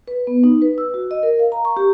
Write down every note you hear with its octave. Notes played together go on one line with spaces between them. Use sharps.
B4
B3
D#4
B4
E6
F#4
D#5
A#4
F5
A#5
C#6
G4